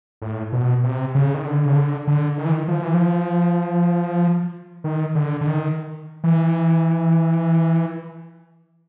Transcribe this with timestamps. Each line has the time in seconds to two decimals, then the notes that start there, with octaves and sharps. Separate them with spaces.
0.22 A2
0.52 B2
0.84 C3
1.15 C#3
1.34 D#3
1.45 D3
1.65 C#3
1.76 D3
2.07 D3
2.38 D#3
2.46 E3
2.51 D#3
2.68 F3
2.82 E3
2.94 F3
4.84 D#3
5.15 D3
5.41 D3
5.47 D#3
6.24 E3